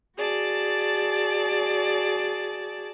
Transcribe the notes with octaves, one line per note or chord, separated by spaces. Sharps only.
F#4 G#4 D5 A5